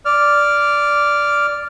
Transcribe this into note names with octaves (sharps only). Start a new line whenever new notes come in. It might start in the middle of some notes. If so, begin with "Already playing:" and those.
D5 F6